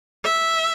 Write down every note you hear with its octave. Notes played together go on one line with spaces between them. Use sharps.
E5